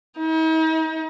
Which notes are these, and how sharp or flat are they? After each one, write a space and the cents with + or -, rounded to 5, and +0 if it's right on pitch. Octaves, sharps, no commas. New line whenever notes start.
D#4 +45